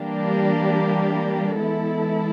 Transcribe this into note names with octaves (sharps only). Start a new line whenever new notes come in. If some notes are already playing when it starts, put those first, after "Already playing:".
Already playing: E3 G3 A#3 D4 G4
E3 G#3 B3 E4 A4